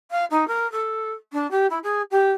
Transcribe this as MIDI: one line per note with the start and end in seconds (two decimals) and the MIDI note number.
0.11 0.25 77
0.30 0.47 63
0.47 0.70 70
0.72 1.11 69
1.32 1.49 62
1.51 1.66 67
1.70 1.78 64
1.83 2.02 68
2.11 2.31 67